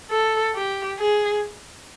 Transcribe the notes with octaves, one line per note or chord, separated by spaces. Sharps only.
A4
G4
G#4